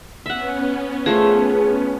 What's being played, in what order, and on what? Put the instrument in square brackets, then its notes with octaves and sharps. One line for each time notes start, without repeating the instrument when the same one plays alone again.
[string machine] B3 C#4 [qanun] E5 F#5
[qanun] F3 A3 [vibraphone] G#4